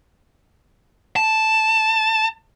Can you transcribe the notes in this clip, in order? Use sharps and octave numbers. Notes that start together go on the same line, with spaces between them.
A5